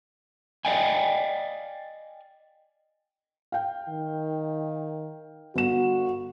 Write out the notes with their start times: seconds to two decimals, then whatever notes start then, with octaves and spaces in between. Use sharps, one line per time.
0.65 D5 D#5 F5 G5 G#5
3.52 F5 G5
3.89 D#3
5.56 G1 F#4 E7